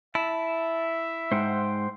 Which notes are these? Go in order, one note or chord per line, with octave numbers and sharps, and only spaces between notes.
E4 E5 A5
G#2 C5 F#5 G5